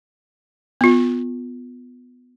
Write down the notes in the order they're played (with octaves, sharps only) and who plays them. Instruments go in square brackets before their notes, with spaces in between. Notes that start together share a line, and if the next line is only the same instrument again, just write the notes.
[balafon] B3 F4